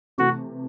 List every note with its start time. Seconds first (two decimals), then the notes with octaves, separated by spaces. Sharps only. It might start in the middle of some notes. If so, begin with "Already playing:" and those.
0.18 C3 E3 A3 F#4